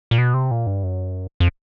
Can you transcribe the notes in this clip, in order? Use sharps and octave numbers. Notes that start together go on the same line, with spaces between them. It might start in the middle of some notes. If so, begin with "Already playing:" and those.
A#2
B2
C3
A#2
G2
F#2
F2